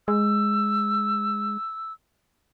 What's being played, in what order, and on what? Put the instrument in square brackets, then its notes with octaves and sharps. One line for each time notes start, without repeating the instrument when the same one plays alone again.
[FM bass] G#3 [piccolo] E6